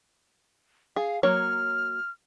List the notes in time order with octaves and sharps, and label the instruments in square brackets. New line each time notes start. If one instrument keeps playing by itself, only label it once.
[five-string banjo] G#4 [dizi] F5
[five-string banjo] F#3 A#3 C#5 [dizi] F6